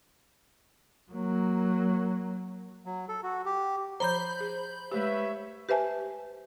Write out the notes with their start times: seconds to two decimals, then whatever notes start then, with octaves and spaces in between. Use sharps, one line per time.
1.12 F#3 A#3
2.86 F#3
3.09 A4
3.23 F#4
3.45 G4
4.00 F3 C5 C#5 A#5 B5 G6
4.40 G#4
4.91 G#3 A3 G4 B4 C#5 E5
5.69 G4 B4 C5 E5 G#5 A5